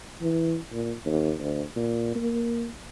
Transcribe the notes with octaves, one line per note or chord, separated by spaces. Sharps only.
E3
A#2
D#2
D2
A#2
A#3